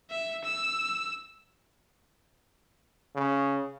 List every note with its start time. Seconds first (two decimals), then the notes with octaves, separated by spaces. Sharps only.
0.10 E5
0.44 E6
3.15 C#3